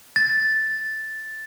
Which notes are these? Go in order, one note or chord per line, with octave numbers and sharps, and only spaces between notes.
A6